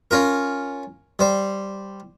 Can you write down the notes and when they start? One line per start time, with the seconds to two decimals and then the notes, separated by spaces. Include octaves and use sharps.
0.11 C#4 F4 A#4
1.19 G3 C5